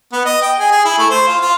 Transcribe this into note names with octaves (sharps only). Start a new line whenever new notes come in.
B3
D#5
G5
G#4
G#4
E4
A3
C5
F4
F4